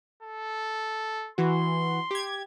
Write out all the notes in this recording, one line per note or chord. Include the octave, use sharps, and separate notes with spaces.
A4
E3 F#4 C6
G4 G#6